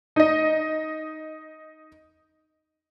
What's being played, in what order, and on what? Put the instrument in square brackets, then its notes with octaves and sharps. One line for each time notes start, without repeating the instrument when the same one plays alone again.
[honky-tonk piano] D#4 D#5